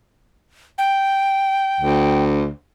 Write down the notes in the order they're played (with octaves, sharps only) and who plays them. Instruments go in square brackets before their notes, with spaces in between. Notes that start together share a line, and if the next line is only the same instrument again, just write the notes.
[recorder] G5
[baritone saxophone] D2